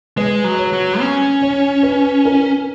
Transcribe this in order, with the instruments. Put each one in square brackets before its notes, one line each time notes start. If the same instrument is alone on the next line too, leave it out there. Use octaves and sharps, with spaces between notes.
[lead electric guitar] G#3 [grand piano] B4
[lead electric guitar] F#3
[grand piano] C#5
[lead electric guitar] F#3
C#4
[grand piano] C#5
B4
A#4